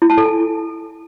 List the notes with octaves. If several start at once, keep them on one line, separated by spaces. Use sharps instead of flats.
E4
A5
A4
G#5